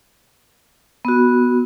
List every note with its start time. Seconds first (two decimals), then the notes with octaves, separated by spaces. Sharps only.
1.05 B3 F#4